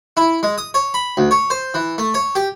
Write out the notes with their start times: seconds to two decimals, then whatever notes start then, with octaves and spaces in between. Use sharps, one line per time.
0.17 E4
0.43 G#3
0.58 D#6
0.74 C#5
0.94 B5
1.17 D2
1.31 C#5
1.50 C5
1.74 E3
1.98 A3
2.14 C#5
2.35 G4